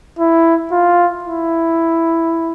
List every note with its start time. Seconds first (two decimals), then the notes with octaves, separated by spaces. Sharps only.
0.19 E4
0.71 F4
1.24 E4